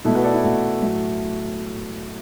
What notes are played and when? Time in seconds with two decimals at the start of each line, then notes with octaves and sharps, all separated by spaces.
0.05 B2 A3 E4 A4
0.15 F#4 B4
0.24 A4 D5
0.34 E4
0.44 B2 A3 F#4
0.82 A2 F#3 A3